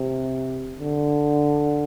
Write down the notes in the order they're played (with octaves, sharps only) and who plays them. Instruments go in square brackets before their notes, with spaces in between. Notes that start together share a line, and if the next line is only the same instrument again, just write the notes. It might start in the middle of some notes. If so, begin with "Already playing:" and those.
Already playing: [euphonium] C3
D3